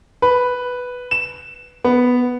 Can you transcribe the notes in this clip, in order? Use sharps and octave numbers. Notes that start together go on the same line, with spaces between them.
B4
E7
B3